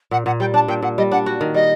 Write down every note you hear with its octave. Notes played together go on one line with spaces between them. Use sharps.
A#2 F#5
A#2 F#5
G3 G5
D4 A5
A#2 G5
A#2 F#5
G3 D#5
D4 F#5
F#4
D#3
G3 D#5